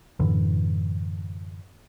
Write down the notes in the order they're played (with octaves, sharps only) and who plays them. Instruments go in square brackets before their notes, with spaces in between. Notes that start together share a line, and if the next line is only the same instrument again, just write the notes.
[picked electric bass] F#2 A2 D3 E3